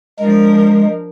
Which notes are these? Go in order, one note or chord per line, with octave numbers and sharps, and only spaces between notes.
F3 G#3 D4 A#4